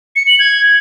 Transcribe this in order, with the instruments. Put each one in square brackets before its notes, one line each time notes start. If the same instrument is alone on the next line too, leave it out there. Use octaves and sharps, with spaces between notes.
[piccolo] C#7
F#7
G#6